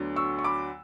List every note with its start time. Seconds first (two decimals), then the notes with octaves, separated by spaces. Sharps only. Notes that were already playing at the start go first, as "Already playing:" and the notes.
Already playing: D2 D3 F#3 B3
0.16 C#6 E6
0.39 C#6
0.44 B5 D6